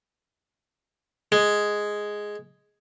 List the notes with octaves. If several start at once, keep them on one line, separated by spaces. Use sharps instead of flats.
G#3